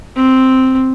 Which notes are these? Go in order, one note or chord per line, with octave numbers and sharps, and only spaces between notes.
C4